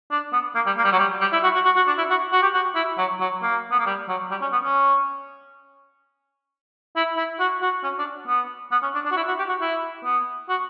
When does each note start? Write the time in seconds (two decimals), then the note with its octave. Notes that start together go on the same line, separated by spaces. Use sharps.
0.11 D4
0.33 B3
0.55 A#3
0.66 G3
0.77 A#3
0.84 G3
0.92 F#3
0.98 G3
1.21 G3
1.33 E4
1.43 F#4
1.55 F#4
1.65 F#4
1.76 F#4
1.87 D4
1.98 E4
2.10 F#4
2.32 F#4
2.42 G4
2.54 F#4
2.75 E4
2.98 F#3
3.20 F#3
3.42 A#3
3.71 B3
3.79 A#3
3.86 G3
4.08 F#3
4.30 G3
4.42 C#4
4.52 B3
4.64 C#4
6.96 E4
7.17 E4
7.40 F#4
7.62 F#4
7.83 C#4
7.99 D4
8.27 B3
8.71 B3
8.82 C#4
8.94 D4
9.05 D4
9.11 F#4
9.16 E4
9.27 F#4
9.38 G4
9.49 F#4
9.61 E4
10.04 B3
10.49 F#4